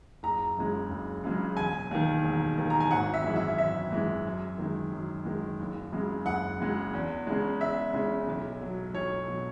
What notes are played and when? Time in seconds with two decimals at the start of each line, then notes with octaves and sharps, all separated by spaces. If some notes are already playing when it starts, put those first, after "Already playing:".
0.23 F#1 A#5
0.57 F#2 C#3 G#3
0.90 F#1
1.24 F#2 C#3 G#3
1.57 E1 G#5
1.91 D#2 D#3
2.24 E1
2.58 D#2 D#3
2.70 A#5
2.80 G#5
2.91 G#1 F#5
3.14 E5
3.24 F#2 E3 G#3
3.36 E5
3.58 G#1 E5
3.92 F#2 E3 G#3
4.26 F#2
4.58 D#3 G#3
4.92 F#2
5.26 D#3 G#3
5.60 F#1
5.92 F#2 C#3 G#3
6.26 F#1 F#5
6.60 F#2 C#3 G#3
6.93 E2
7.27 C#3 G#3
7.60 E2 E5
7.94 C#3 G#3
8.28 B1
8.61 B2 F#3
8.94 B1 C#5
9.28 B2 F#3